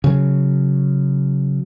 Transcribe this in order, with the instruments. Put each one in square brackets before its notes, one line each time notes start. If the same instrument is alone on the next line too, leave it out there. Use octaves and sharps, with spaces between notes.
[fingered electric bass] C#3 F#3